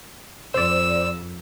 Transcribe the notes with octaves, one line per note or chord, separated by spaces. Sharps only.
F2 C5 D5 E6